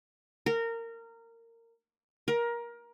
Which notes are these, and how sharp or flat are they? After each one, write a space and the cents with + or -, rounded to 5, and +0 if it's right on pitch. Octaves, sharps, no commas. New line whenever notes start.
A#4 -20
A#4 +20